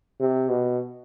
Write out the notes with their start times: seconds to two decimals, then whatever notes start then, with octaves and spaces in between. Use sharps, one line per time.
0.20 C3
0.49 B2